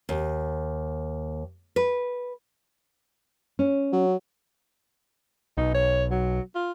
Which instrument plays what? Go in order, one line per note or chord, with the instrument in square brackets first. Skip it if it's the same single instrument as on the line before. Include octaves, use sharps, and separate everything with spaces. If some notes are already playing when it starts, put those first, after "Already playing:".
[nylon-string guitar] D#2
B4
C#4
[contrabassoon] F#3
[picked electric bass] B1 [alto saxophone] D#4
[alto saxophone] C#5
F#3
F4